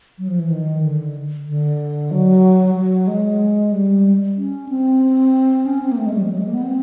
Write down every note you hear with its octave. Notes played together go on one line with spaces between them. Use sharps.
F#3
F3
E3
D#3
D3
D3
F#3
F#3
G#3
G3
C#4
C4
C#4
C4
A#3
A3
G#3
G3
F3
F#3
G#3
A#3
B3
C4